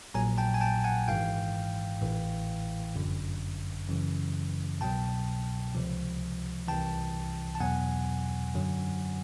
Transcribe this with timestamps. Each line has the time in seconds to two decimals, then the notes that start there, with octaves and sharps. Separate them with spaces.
0.14 A#1 A#2 F#3 G#5 A#5
0.38 G5 A5
0.54 G#5
0.61 G5 A5
0.84 F#5 G#5
1.08 G#1 G#2 E3 F5 G5
2.01 A1 A2 E3
2.95 G1 F#2 D3
3.89 F#2 C#3 E3
4.81 C2 B2 F#3 G5 A5
5.75 C#2 C3 F3
6.68 C2 C3 E3 G5 A5
7.55 A5
7.60 E2 B2 F#3 F#5 G#5
8.54 F#2 D3 F#3